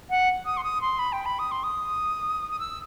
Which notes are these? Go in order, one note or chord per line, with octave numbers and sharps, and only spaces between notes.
F#5
D#6
C6
D#6
C6
B5
G5
B5
D#6
C6
D#6
D#6
E6